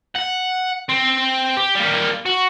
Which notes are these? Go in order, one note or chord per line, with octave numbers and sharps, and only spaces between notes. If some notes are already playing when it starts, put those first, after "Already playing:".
F#5
C4
G4
G3 A#3
F#4